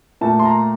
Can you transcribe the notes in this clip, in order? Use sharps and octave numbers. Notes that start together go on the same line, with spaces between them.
A#2 A3 A5
C6
A#5